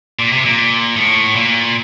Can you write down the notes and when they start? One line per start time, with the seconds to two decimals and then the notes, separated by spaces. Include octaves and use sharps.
0.19 A#2
0.32 C3
0.45 A#2
0.96 A2
1.36 A#2